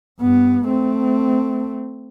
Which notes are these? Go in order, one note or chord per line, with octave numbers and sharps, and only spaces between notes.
G2 B3
A3 C4